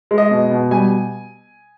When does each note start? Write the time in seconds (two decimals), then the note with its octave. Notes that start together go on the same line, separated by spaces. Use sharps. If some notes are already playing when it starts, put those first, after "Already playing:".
0.11 G#3
0.18 D#5
0.31 B2
0.51 B2
0.71 G3 G#5